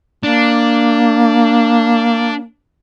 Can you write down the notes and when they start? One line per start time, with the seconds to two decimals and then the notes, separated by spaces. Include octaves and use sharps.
0.24 A#3 D4